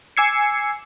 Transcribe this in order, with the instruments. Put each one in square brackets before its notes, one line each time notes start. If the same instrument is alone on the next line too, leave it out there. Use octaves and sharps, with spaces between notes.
[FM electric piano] G#5 D6 E6 G#6 C7 C#7